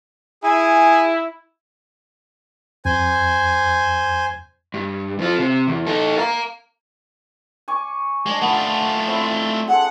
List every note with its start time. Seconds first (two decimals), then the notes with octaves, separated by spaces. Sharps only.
0.43 E4 G#4 G#5
2.85 F2 C5 G#5
4.74 G2
5.19 F2 F4
5.38 C3
5.68 E2
5.87 D#4 A4
6.18 F5 A#5
7.68 G#5 C#6 D6
8.26 G#3 D4 G#5
8.41 A3 B3 F4
9.07 C4 E4
9.68 G#3 A4 F#5